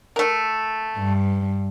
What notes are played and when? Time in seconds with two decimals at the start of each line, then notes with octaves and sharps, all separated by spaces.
0.16 A3 A#4
0.97 G2